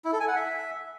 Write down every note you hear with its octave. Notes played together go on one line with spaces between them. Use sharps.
E4
A4
G#5
F#5
E5